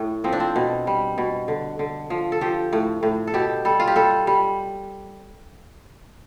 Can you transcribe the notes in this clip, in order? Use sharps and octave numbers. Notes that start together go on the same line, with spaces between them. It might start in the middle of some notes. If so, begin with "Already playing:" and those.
Already playing: A2
F3 C4
D4
C4
B2
G3
B2
D3
D3
F3
A4
F3 G4
A2
A2
A4
B2 G4
G3 A4
F4
G4
G3 A4
G3